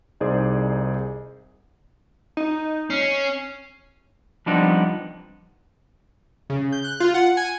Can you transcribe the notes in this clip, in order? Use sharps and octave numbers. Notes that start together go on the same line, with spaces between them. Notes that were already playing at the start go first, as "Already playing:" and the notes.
C2 D#4 G#4 C5 D5
D#4
C#4 C7
F3 G3 B3 C4 D4 D#4
C#3
G6
F#6
F4
F#5
G#5